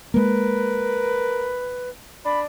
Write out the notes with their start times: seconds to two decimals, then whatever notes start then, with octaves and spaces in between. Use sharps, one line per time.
0.14 G#3 A#3 A#4 B4
2.25 D4 B5